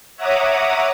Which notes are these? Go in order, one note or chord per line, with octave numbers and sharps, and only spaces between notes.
C#5 E5 F#5 A#5 D6 D#6